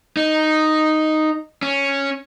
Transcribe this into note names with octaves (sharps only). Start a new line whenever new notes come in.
D#4
C#4